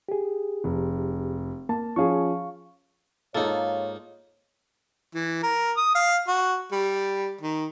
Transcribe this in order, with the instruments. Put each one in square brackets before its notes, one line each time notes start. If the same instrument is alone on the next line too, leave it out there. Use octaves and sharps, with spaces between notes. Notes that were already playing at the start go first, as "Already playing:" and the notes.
[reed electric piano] G4 G#4
[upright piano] F1
[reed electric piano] A#3 [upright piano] A5
[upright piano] F3 C#4 G#4 [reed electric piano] F5 C#6
[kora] G#2 F4 A4 [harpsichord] A#3 D#4 [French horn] C#5
[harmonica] E3
A#4
D#6
F5
F#4
G3
D#3